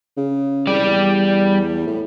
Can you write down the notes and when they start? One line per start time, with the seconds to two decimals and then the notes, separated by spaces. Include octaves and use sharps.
0.17 C#3
0.67 C2 G3 D5
0.84 E2
1.87 A2